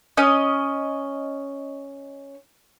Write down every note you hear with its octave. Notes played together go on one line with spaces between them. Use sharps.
C#4 D#5